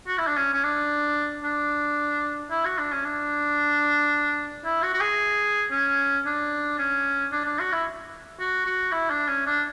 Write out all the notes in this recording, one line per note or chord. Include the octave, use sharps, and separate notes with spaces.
F#4
E4
D4
C#4
C#4
D4
D4
E4
F#4
D4
C#4
D4
E4
F#4
F#4
G#4
C#4
D4
C#4
D4
D4
F#4
E4
F#4
F#4
E4
D4
C#4
D4